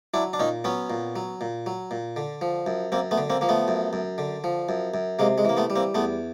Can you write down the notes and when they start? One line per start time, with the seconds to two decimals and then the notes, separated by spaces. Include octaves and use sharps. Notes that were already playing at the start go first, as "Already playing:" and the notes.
0.14 F#3 D4 E4
0.33 D4
0.39 A#2 C#4 D#4
0.64 F#3 B3 C#4
0.90 A#2
1.16 F#3
1.41 A#2
1.66 F#3
1.91 A#2
2.16 D3
2.41 F3
2.67 F#2
2.92 F#2 A#3 C4
3.11 A3 B3
3.18 D3
3.30 A#3 C4
3.41 F3 A#3
3.49 A3 B3
3.68 F#2
3.93 F#2
4.18 D3
4.44 F3
4.69 F#2
4.94 F#2
5.19 C3 G#3 A#3
5.38 G#3
5.45 E3 A#3
5.57 A3 B3
5.70 G3
5.76 A#3 C4
5.95 E2 A3 B3